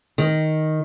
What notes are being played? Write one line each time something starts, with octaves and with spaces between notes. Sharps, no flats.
D#3